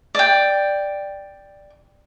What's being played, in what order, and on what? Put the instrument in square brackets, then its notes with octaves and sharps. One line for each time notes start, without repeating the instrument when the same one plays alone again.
[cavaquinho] D5 G5